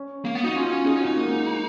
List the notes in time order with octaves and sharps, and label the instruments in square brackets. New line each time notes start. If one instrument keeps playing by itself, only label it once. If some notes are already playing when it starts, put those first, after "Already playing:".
Already playing: [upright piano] C#4
[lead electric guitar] A#3
B3
[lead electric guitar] D#4 [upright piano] F#4
[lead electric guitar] C#4 [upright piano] F4
[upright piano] F#4
[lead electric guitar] D#4 [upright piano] G#4
[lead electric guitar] C#4
[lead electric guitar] D#4 [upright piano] F#4
[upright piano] A#3
G#3